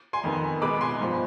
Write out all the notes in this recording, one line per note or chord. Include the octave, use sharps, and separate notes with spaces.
G#5 C6
F2 D#3 B3
B2 G#3 B3 B5 D6
G#5 C6
G2 F3 C4